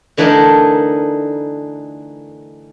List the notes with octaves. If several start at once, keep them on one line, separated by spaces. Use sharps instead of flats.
D3 E3 A3 D4 D#4 A#4